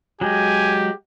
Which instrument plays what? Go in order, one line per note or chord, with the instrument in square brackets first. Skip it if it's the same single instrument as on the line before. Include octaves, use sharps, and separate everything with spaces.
[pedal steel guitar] F#3 G#3 [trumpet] G4 [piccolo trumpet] G#5